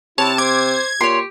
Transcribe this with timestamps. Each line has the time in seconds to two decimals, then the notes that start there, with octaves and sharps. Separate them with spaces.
0.18 C3 E4 C#5 A5
0.38 C5 D6 G#6
1.01 A#2 G4 C#5 C6